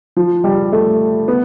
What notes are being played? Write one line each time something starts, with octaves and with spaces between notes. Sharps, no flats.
F3
G3
A3
B3